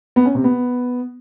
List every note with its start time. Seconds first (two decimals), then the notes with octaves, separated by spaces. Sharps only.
0.16 B3
0.25 C#4
0.35 C3
0.44 B3